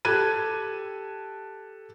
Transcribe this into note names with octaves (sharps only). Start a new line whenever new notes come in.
G4 A4 F#6 G#6 D#7